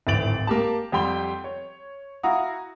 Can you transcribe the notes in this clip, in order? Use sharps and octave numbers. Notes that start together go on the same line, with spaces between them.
D1 G#1 E3 A6 D7 F#7
A#3 G4 A5
F2 G3 F#5 G5 C6 G7
C#5
E4 F#4 F5 F#5 A#5 D#6